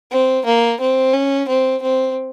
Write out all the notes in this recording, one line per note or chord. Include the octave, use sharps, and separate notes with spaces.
C4
A#3
C4
C#4
C4
C4